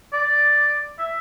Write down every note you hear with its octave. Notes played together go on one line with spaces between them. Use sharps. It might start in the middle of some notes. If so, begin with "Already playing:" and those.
D5
E5